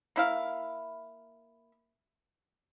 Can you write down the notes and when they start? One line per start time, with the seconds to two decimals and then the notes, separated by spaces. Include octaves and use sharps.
0.16 A#3 E4 F5